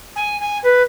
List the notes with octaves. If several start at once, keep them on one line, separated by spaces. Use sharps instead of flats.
G#5
G#5
B4